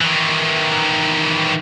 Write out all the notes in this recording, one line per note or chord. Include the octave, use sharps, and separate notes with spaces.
D#3 E3